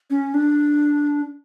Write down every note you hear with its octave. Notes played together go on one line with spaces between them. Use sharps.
C#4
D4